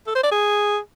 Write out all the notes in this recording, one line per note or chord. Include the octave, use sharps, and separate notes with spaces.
A4
C5
D5
G#4